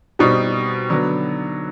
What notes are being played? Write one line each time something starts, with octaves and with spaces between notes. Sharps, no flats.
B2 G3 C4 D#4
D3 F#3 B3